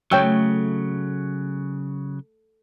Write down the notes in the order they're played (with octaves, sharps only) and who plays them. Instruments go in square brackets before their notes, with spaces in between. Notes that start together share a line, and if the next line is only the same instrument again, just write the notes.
[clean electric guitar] C#3 F#3 [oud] A3 [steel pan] C#5 G5 E6